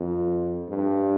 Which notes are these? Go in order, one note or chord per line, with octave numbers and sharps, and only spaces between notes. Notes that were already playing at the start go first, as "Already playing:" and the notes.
Already playing: F2
G2